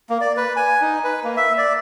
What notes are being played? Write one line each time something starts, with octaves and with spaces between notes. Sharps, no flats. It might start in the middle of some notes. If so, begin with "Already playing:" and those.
A#3
D5
B4
G#5
D#4
B4
A#3
E5
D5